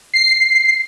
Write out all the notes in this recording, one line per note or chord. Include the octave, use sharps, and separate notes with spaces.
C7